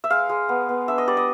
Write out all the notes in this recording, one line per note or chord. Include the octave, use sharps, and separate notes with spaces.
E5
G#3 F5
G#3
B3
B3
D4 E5
D#5
G3 D5
D#5